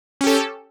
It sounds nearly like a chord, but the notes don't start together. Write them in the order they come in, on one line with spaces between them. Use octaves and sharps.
C#4 G4 A4